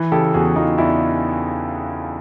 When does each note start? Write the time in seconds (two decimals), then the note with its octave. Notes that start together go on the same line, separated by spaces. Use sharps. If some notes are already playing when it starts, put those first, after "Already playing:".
Already playing: E3
0.12 C#3 G4 A4
0.34 E2 F#4 G#4
0.56 E2 D#4 F4
0.78 E2 D4 E4